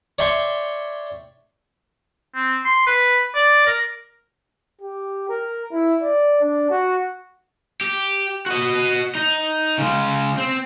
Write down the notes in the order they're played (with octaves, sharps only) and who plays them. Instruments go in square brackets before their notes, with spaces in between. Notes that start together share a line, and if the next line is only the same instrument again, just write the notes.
[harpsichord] C#5 D5 E5 G5 C6 C#6
[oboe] C4
C6
B4
D5
A#4
[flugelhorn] G4
A#4
E4
D5
D4
F#4
[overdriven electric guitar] G4
F#4 D#5
D#4
C#3 G#3
C4